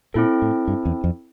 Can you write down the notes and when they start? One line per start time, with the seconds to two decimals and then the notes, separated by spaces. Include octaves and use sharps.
0.14 A#2 C4 E4 A4
0.42 A2
0.68 G2
0.85 E2
1.04 F2